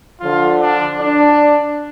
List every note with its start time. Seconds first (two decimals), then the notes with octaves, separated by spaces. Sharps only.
0.20 D3 F3 F4
0.59 D4
0.99 D4